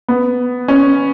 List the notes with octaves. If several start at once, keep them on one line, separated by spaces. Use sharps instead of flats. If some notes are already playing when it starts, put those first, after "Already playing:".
B3
C#4